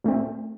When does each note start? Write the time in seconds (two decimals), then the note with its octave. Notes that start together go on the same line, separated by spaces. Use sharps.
0.04 A#2 A3 C4